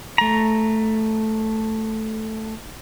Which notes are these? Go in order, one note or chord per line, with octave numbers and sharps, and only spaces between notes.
A3 A#5